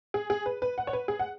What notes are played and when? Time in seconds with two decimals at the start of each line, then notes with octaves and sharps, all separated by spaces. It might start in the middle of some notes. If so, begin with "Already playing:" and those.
0.14 G#4
0.30 G#4
0.46 B4
0.62 B4
0.78 F#5
0.87 C#5
0.93 B4
1.08 G#4
1.19 F#5